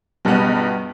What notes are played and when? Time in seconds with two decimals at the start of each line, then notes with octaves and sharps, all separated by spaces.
0.25 C#2 G2 B2 G3 B3